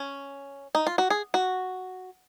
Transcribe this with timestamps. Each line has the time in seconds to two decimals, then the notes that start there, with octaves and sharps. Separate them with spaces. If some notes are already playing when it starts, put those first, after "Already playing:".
Already playing: C#4
0.75 D#4
0.87 F4
0.98 F#4
1.10 G#4
1.34 F#4